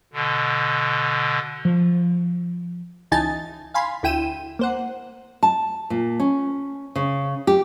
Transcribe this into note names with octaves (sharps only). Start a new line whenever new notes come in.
B2 D3
F3
C#2 E3 D#4 G#5 A5 A6
F5 G#5 B5 C6
D2 E4 G5 D#7 E7
A#3 C5 F#5
A5
A#2
C#4
C#3
G4